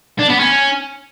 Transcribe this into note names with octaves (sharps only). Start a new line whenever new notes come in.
D4
B3
C#4